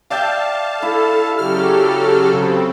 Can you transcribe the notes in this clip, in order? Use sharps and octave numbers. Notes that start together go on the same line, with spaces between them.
D5 E5 F5 G5 A5
E4 A4
C#3 F#3 G4 A4 F6
C#3 C4